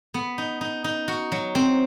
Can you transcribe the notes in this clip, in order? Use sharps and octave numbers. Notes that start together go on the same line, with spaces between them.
B3
D#4
D#4
D#4
F#4
F#3
C4